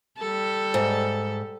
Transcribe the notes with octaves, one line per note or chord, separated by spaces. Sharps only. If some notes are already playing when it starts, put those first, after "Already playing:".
G3 A4
G#2